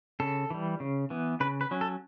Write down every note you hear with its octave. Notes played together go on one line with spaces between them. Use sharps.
C#3 A4
E3 G3
C#3
E3 B3
C#3 B4
B4
F#3 C#4
A4